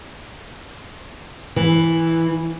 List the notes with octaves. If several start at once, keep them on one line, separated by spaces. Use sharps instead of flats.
E3